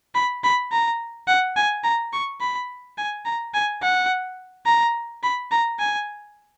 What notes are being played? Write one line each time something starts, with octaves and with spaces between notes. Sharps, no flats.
B5
B5
A#5
F#5
G#5
A#5
C#6
B5
G#5
A#5
G#5
F#5
A#5
B5
A#5
G#5